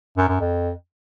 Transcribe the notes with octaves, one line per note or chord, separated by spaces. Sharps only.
F#2
F#2
F2